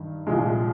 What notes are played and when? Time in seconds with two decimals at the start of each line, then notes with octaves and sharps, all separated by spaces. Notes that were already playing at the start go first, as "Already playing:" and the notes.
Already playing: G2 D#3
0.27 C2 A#2 F3 G#3